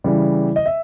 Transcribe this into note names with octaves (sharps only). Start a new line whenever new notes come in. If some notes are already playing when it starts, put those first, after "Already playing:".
C#3 E3 G3
D#5
E5